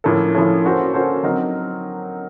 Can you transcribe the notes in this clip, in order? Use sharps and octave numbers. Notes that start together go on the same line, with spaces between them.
A2 F3 A#3 C#4 A4
A2 F3 A#3 C#4 A4
A#3 C#4 F#4 A4 C5
A#3 C#4 F#4 A4 C5
F#3 C4 D#4 A#4